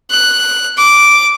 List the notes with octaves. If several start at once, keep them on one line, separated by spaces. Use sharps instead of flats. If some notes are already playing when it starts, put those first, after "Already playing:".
F#6
D6